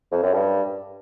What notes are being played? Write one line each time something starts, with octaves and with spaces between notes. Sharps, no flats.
F2
F#2
G2